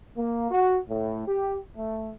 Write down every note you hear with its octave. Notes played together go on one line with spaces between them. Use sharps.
A#3
F#4
A2
G4
A3